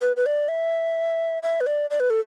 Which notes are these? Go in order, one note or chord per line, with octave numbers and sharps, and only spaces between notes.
B4
B4
D5
E5
E5
B4
D5
D5
B4
A4